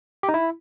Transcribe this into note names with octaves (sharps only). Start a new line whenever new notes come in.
G4
D#4
E4